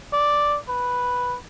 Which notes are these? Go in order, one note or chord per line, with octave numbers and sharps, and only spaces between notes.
D5
B4